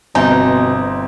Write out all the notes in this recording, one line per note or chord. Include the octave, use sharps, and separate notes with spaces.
G1 B2 C4 D#4 E5 G#5